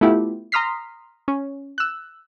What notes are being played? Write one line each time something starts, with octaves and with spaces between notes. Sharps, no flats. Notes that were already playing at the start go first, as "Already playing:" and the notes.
A3 B3 E4 F4 G4
A#5 C6 D#6 F6 B6 C7
C#4
E6 F#6